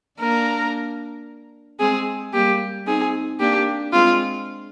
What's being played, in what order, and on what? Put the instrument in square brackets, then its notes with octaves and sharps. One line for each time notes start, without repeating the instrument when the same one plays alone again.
[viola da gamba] A#3 D4 [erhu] A#4
[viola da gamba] G#3 C4 [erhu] G#4
[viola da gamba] G3 A#3 [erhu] G4
[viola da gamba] C4 D#4 [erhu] G#4
[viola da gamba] A#3 D4 [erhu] G4
[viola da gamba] G#3 C4 [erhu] F4